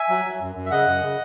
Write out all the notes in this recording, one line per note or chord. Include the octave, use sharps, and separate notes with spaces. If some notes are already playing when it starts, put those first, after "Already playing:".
Already playing: E5 G#5
F#3
F#3
F#2
F#2
E5
C#3 D#5 F#5
F#2
C#3